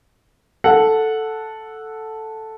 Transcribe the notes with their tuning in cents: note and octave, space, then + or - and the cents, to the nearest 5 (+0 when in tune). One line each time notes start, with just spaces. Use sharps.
A4 +0 F#5 -10